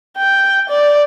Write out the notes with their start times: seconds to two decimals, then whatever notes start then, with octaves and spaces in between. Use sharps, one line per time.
0.17 G5
0.69 D5